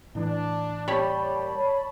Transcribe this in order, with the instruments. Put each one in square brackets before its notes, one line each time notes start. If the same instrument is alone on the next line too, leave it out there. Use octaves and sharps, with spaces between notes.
[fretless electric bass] A2 E3 [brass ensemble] D4
[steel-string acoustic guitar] G3 [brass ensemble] A#3 G4 [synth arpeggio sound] C#5 A5 B5